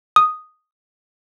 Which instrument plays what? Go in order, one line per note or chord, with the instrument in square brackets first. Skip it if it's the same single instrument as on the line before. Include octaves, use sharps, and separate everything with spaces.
[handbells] D#6